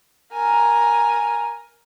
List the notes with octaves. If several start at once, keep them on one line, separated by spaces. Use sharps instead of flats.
A#4 G#5